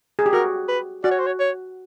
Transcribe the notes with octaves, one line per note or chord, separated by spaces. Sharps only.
G#4
G4
F#4 A#4
B4
F#4 D5
C#5
C5
C#5
C#5